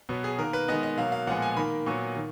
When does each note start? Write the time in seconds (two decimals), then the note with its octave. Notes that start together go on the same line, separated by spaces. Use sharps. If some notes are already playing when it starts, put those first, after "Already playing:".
0.09 B2 F#3 B3
0.24 G#4
0.38 D#3 A#3 A#4
0.53 B4
0.68 D#3 G#3 B3 D#5
0.83 D#5
0.97 B2 F#3 A#3 F5
1.12 F5
1.27 A#2 F3 G#3 B3 F#5
1.42 G#5
1.57 D#3 A#3 B5
1.86 A#2 F#3 B3 C#6
2.16 D#3